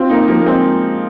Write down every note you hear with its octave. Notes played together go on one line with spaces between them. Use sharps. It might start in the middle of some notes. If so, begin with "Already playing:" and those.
Already playing: C4 F4
A#3 D#4
F3 A#3
A#3
G#3 C4